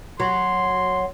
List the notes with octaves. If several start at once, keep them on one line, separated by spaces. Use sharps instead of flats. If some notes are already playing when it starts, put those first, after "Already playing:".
F#3 C6